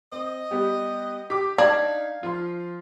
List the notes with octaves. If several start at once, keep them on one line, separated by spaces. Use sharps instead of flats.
C4 D#5
G3 B3 G4
G4 D6 B6
D4 D#4 F5 G#6
F3 F4 C6